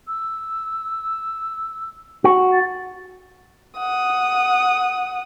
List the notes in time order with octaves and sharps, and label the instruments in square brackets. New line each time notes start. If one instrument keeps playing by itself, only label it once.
[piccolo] E6
[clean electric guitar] F#4
[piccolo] A6
[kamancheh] F#5 D#6